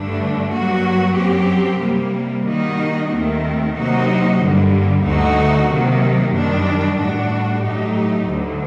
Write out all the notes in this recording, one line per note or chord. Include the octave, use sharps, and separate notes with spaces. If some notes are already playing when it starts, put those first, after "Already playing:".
Already playing: G2 D3 A3 D4
G2 F#3 A#3 F#4
F#2 F#3 C4 G4
C3 G3 A#3
D#3 G3 A#3 D#4 F#4
D#2 D#3 A3 C4
C3 F#3 A#3 D#4 F#4
G2 D3 G3 A#3
D2 D3 A3 D#4 F#4
C3 D#3 F#3 A#3
F#2 D#3 G3 D4
A2 G3 D4 F#4
A2 F#3 A3 D#4 G4
D2 D3 F#3